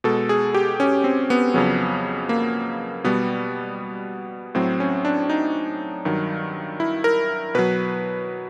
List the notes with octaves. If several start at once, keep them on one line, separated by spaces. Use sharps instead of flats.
B2 G#3 A4
G#4
G4
C#4
C4
B3
F2 C#3 F#3
A#3
B2 G3 B3
A2 F#3 C4
C#4
D4
D#4
G2 D#3 F#3
E4
A#4
B2 F#3 B4